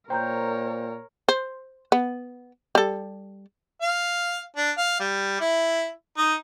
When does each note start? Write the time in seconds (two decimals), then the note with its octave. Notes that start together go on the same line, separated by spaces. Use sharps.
0.10 A#2 A#4 C5 C#5 G5 A#5 G6
1.29 C5
1.92 B3
2.75 G3 A4
3.82 F5
4.56 D4
4.77 F5
5.00 G3
5.41 E4
6.17 D#4